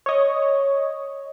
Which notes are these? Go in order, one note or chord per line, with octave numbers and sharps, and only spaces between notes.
C#5 D#5